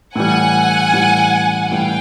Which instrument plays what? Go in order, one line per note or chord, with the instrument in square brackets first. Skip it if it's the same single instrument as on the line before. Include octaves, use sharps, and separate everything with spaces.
[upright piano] A2 E3 G3 [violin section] F#5 G#5
[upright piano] A2 E3 G3
[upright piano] A2 E3 G3 [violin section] F5 G5